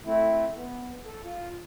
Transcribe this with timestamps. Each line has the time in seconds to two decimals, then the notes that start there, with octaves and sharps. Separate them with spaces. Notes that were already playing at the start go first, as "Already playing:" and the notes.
0.05 A3 C4 E4
0.55 B3
1.05 A4
1.24 F4